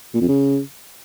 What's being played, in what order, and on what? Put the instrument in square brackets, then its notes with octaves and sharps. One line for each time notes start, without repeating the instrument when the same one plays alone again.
[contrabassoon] A#2
F2
C#3